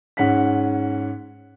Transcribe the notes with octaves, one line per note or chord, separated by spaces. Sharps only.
G#2 C#4 F#5 B6